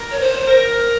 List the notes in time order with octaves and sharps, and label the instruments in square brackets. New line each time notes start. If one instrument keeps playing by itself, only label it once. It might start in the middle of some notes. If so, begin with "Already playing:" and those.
Already playing: [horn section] A#4
[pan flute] C#5
C5
[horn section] A#4